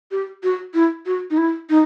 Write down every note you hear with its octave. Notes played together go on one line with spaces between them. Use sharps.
G4
F#4
E4
F#4
D#4
E4
D#4